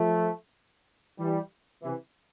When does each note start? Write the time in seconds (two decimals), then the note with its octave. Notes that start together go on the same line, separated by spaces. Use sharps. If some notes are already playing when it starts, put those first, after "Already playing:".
Already playing: F3 A3
1.18 E3 G3
1.83 C3 E3